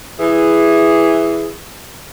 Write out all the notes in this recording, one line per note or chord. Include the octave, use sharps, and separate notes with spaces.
E3 G#4